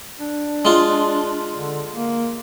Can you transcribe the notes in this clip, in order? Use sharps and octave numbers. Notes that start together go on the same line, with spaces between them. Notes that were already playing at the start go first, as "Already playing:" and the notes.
D4
G#3 F4
D3
A#3